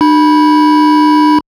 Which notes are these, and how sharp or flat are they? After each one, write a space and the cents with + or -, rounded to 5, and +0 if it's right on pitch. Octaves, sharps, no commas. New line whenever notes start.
D4 +45 B5 -15